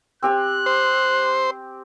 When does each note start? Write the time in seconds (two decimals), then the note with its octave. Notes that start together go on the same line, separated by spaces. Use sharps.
0.23 C4 G4 G#5 F#6
0.66 C5